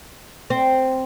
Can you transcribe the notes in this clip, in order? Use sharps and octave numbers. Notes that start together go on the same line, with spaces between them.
C4